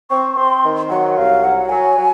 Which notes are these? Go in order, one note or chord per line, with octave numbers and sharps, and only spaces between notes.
C4 C#6
C4 C6
D#3
F#3 F#5
C2 F5
F#3 F#5
F#3 G#5
F#3